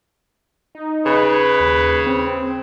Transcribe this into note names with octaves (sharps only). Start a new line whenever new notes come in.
D#4
C#3 B4
D#2
C4